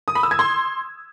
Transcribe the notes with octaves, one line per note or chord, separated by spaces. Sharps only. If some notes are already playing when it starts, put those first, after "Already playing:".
D#6
B5
E6
G#6
C6